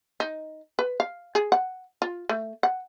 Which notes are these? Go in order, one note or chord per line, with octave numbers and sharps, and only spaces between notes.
D#4
B4
F5
G#4
F#5
F4
A3
F#5